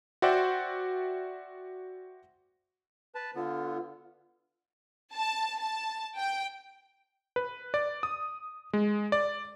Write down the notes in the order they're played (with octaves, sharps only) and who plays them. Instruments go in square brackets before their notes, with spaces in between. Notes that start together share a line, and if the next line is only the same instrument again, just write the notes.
[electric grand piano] F#4 C5 D5 E5 F#5 G5
[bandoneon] B4 A5
[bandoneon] D3 B3 [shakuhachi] F4
[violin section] A5
A5
G5
[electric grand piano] B4
D5
D#6
G#3
D5